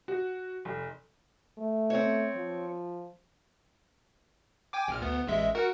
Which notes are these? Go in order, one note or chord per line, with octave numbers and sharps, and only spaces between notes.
F#4
F1
A3
C4 C#5
F3
G5 G#5 D6
A#1 A#2 F6
D2 B3
A1 G#3 E5
F#4 A#4 F#5